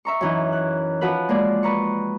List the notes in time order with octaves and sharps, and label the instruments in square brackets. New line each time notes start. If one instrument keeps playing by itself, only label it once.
[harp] E5 A#5 C#6
F#2 E3 D#4
F#6
F3 F#4 B4 B5 F#6
G#3 A#3 D5
B4 A#5 C#6